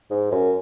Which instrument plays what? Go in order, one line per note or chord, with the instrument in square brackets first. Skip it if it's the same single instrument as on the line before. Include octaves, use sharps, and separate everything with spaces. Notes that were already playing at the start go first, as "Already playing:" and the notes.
[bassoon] G#2
F#2